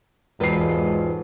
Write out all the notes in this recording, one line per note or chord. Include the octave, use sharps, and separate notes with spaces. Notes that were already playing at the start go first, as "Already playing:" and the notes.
E1 G#2 F4 A4 B4 C7